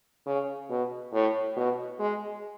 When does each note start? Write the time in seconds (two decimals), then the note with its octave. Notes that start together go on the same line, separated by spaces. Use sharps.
0.26 C#3
0.69 B2
1.13 A2
1.56 B2
1.99 G#3